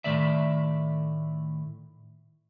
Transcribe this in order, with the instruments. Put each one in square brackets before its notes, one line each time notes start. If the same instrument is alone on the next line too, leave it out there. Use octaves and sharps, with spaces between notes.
[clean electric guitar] A2 D#3 E3 A3 D5 E5